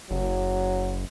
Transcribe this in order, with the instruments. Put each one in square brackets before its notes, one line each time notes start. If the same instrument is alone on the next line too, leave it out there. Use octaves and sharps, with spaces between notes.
[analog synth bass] F#1 [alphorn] F#3